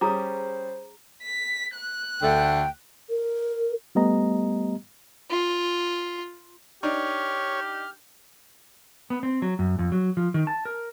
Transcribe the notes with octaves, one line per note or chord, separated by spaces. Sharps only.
G3 C#4 G#4 C5 A#5 D6 D#6
B6
F#6
D2 D3 A3 G5
A#4
G3 A3 B3 G4 D#5 A#5
F4
D4 D#4 G4 C#5 F6
B3
C4
F#3
F#2
F2
F#3
F3
D#3
A5
A#4